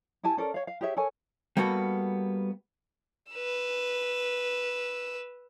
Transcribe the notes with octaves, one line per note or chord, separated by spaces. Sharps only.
E4 G4 G#5 A5
C#4 A4 A#4 D5
C#5 F5
F5
G4 G#4 C#5 E5
A4 A#4 C#5 G#5
G3 A#3 B3 F#4 A4
B4 E6